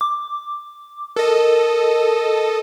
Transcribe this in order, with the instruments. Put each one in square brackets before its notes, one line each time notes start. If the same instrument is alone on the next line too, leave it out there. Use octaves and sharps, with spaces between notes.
[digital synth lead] D6
[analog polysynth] A4 D#5 [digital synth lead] A#4